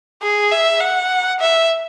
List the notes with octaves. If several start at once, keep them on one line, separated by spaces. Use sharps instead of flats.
G#4
E5
F#5
E5